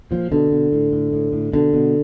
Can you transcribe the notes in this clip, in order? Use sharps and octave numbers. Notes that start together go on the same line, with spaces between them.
A#2 F3
B2 D3
B2
A2
A2
A2
A2
B2 D3
B2